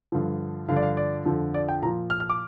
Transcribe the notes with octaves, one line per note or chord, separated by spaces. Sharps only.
G2 D3 F3
G2 D3 F3 F5
D5
F5
D5
F2 D3 F3
D5
G5
A#2 F3 A#5
F6
F6
D6